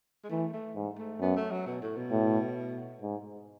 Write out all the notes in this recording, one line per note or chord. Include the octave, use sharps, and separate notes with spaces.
G#3
E3 A3
A3
G#2
A3
F#2 B3
A3
F#3
B2
A2
B2
A2
G#2